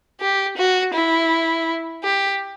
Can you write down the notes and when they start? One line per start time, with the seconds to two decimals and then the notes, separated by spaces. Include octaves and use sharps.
0.21 G4
0.57 F#4
0.94 E4
2.04 G4